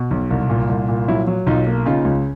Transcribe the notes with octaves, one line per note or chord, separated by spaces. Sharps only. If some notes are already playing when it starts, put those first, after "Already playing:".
Already playing: B2
B1
C2
A#2
C2
A#2
F#3 E4
F#3
B1 D#4 F4
A#3
C#3 D#4 F4
C#2